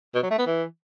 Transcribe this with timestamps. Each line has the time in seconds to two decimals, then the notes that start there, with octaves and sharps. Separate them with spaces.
0.15 B2
0.23 F#3
0.31 A3
0.39 B3
0.46 E3